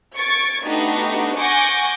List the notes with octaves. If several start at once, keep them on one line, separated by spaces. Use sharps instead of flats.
C#6 G#6 A6 C#7 D7
A3 B3 D4 D#4 F#4 G4
F#5 G#5 C#6 D6 G6 A#6